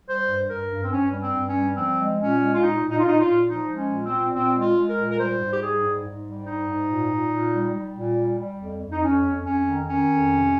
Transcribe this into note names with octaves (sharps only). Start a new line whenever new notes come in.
G3 C5
G2
G2 A#4
G2
C4
G2 C#4
G3
C4
G2
C#4
G3
F3 C4
G#3
A#2 C#4
G#3
F4
A#2 D#4
A#2
D#4
F4
A#2 D#4
F4
A#2
F3 D#4
G#3
C#4
A#2
C4
A#2
A#2 C4
G#3
F4
G#3
A#4
A#2
A#4
G3 C5
G#2
G4
G3 G#4
G#2
G#2
G3
G#2 D#4
G#2
A#2
A#2
A#2
G3
G3
A#2
G3
G3
F2
F2
D#4
F2 C#4
F2
F2 C#4
D#3
D#3 C#4
F2
C3